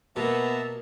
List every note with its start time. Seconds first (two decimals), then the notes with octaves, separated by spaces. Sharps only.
0.16 B2 A#3 B3 E5 A5 A#5